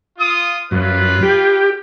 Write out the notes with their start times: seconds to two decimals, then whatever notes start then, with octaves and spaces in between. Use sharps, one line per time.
0.17 F4 D#6
0.71 F#2 F4 B4
1.23 G4